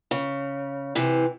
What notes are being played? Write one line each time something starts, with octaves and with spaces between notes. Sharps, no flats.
C#3
C3 E3